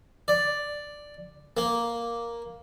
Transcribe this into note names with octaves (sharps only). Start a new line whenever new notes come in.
D5
A#3